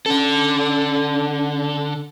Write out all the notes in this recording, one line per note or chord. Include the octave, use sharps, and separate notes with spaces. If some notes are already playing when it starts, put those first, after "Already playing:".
D3 C#4 A4